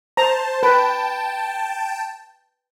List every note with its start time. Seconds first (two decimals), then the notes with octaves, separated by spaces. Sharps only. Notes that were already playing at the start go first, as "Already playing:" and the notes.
0.17 C5 A5 A#5
0.63 B4 G5 A5